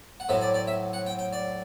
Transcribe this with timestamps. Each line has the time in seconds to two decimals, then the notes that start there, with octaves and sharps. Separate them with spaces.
0.20 F#5
0.29 A2 F#3 C4 E5
0.42 D5
0.54 D5
0.68 E5
0.93 F#5
1.06 G5
1.19 G5
1.33 D5